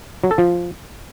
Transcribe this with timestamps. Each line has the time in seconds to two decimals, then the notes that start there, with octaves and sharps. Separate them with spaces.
0.24 F#3
0.31 A4
0.38 F3